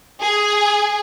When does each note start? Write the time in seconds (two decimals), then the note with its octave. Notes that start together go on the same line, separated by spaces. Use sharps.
0.21 G#4